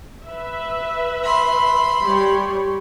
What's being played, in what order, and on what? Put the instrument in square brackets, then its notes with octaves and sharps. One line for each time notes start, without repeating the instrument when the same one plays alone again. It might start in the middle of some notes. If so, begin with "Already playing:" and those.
[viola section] B4 E5
[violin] B5 C6
[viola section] G3 C#5